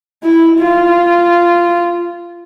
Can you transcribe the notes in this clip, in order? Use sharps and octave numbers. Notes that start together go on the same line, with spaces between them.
E4
F4